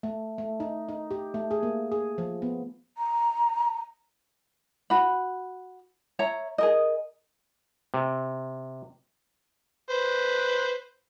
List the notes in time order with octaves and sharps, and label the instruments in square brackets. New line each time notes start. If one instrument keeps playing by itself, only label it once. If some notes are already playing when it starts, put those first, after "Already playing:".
[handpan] A3
A3
D#4
D#4
G4
A3
G#4
A#3
G#4
F3
B3
[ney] A#5
[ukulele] F#4 B5
C#5 E5 A#5
G#4 A#4 D#5
[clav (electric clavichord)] C3
[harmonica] B4 C5